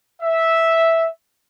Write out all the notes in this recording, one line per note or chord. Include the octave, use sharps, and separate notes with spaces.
E5